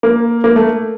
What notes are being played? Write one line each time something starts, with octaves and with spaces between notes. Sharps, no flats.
A#3
A#3
A3